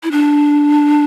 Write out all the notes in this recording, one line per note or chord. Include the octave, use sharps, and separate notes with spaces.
E4
D4